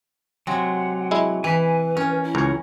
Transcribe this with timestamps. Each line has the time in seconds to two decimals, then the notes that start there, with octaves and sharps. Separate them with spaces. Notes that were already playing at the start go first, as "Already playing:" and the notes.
0.47 C3 F#3 G#3 F#5
1.11 G#3 E4
1.44 E3 B4 G#5 B5
1.97 C#4 A#4
2.24 E4
2.35 C#2 A#4 C#5